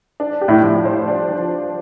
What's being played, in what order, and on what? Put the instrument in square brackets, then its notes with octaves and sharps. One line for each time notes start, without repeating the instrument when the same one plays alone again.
[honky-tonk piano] D4
G4
[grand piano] A2
[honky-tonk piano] F3
C5
D4
F3